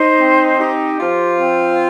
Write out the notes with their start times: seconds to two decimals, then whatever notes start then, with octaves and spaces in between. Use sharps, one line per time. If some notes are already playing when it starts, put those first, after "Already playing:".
Already playing: D#4 C5
0.20 C4
0.60 D#4 G4
1.00 F3 F4
1.40 C4